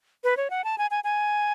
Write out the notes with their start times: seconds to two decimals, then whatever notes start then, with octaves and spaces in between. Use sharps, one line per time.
0.24 B4
0.37 C#5
0.50 F#5
0.64 A5
0.78 G#5
0.91 G#5
1.04 G#5